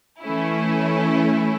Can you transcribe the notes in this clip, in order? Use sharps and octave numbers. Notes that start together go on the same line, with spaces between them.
E3 A3 C#4 E4